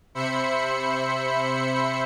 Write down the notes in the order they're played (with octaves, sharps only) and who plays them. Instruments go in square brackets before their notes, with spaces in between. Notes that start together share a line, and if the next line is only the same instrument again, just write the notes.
[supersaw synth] C3 C5 E5 B5 C#7